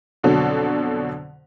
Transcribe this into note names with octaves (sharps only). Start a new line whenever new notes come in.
F2 B2 D3 F#3